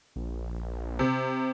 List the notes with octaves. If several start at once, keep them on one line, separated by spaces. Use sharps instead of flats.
A#1
C3